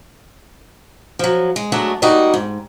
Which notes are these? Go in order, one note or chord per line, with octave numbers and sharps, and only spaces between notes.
F3 F#3
G#3
F#3 G#3 A3 D4 F#4
G3 A#3 D#4 F#4
G#2